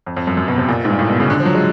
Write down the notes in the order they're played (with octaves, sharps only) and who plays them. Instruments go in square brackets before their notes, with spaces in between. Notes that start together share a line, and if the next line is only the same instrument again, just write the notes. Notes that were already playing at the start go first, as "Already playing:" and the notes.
[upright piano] F2
F2
F#2
F#2
B2
C3
A#2
G#2
G2
A2
B2
C#3
D3
F3
F#3
G#3